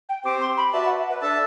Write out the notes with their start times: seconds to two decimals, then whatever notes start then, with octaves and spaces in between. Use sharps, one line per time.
0.09 G5
0.25 C4 G4 C5 D6
0.41 C6
0.57 B5
0.73 F#4 B4 D5 E5 A5
0.85 F#5
0.97 E5
1.09 B4
1.21 D4 A4 E5 A5